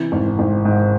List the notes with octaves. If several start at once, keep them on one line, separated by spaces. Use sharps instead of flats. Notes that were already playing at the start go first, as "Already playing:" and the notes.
Already playing: C3 E3
G#1
G#1
G#2